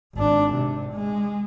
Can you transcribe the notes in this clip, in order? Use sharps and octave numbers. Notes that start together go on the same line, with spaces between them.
G#1 D4
C3
G#3